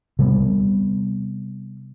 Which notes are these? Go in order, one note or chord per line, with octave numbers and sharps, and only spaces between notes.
C3 G3 A#3 B3